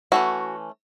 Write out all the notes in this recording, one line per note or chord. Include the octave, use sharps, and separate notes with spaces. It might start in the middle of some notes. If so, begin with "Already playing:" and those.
E3 A3 C#4 F#4